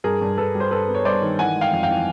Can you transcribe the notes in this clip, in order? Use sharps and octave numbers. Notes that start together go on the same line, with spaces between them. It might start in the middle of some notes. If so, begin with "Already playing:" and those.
G2 G#4 A#4
G2
G2 A4 B4
G3
C5
G2 A4 B4
B3
C#5
G2 C5 D5
D#3
E3 F#5 G#5
G#3
F5 G5
F2
F5 G5
E3